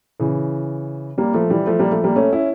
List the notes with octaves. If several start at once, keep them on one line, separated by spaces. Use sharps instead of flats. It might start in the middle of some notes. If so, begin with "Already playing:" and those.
C#3 E3
G3 A#3
F3 A3
E3 G3
F3 A3
G3 A#3
F3 A3
G3 A#3
A3 C#4
C#4 E4